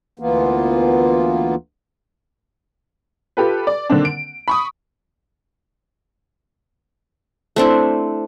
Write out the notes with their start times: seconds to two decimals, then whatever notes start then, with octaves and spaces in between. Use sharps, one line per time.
0.19 D2 E3 A#3 B3 F4
3.37 F4 G4 A4 B4
3.67 D5
3.90 D3 D#3 A#3 C4 D4
4.05 D7
4.48 B5 C#6 D#6
7.56 A3 C4 D4 E4